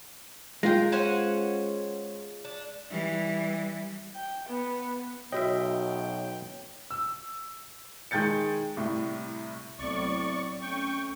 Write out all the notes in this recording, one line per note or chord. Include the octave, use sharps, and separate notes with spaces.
G#3 F4 A#4 G5
C#4 C5 F#5
D4
E3 G3
G5
B3
B1 F#4 C#5 D#5 E5 G5
E6
D#3 G#3 G5 G6 A6 C#7
C2 A2
C2 A2 F#3 B3 C4 D5 C#6
A3 C#4 G5 C#6